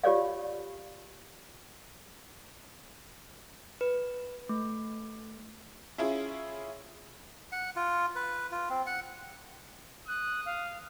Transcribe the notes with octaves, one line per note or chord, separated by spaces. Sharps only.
F4 G4 C#5 D5 F5
B4
A3
C#4 E4 F4 G#4
F#5
F4
B4
F4
C4
F#5
D#6 F#6
F5